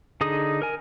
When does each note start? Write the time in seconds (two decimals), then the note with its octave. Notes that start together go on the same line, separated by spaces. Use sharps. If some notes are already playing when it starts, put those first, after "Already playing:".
0.21 D3 D#4 G#4 D#6
0.62 A#4 G#5